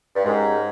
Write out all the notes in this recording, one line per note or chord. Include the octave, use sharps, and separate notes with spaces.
G2
G#2 G#3 C#4 G4 A#4